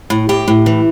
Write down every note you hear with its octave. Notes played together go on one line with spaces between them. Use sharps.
A2
A2 G4
A2
E3